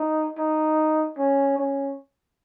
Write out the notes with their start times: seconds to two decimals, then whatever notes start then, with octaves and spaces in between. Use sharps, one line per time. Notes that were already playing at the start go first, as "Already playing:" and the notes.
Already playing: D#4
0.38 D#4
1.18 C#4
1.58 C#4